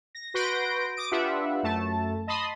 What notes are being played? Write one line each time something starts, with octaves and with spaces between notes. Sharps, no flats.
A#6
F#4 B4 C6 G6 A#6 D7
D6 D#6 D7
D4 F4 G4 B4 E5 F#5
F#2 A3 A5
D#5 A5 B5 C6 D#6